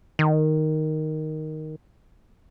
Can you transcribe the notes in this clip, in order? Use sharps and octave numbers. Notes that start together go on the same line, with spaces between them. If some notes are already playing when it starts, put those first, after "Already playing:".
D#3